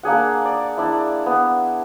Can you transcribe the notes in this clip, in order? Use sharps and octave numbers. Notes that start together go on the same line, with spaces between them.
A#3 D4 G#4 F#5
D5
D4 E4
B3